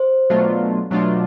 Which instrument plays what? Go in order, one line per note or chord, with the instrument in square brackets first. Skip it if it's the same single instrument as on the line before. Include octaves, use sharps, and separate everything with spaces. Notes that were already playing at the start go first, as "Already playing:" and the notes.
Already playing: [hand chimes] C5
[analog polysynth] B2 F#3 A3 D4 F4
B2 F#3 A3 D4 F4